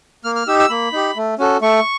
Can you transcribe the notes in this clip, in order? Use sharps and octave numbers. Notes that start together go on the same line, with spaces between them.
A#3 F6
F6
D#4 G4 E6
E6
A#3 B5
D#4 G4
A3
C#4 F#4 A4
A3 C#6